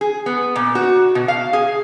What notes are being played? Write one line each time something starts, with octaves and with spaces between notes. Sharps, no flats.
G#4
B3
A#2
F#4
B2
F5
G#4